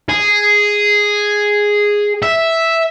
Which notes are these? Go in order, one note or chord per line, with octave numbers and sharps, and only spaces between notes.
G#4
E5